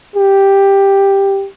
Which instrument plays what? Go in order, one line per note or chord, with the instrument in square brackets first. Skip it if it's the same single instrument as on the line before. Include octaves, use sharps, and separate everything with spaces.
[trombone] G4